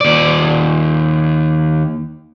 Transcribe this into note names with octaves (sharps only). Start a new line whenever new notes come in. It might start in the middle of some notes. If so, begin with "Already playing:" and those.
D#2 D5